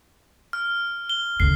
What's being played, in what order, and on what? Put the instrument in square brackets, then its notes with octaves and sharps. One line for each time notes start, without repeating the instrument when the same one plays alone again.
[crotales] F6
G7
[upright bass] D2 C#3 [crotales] C7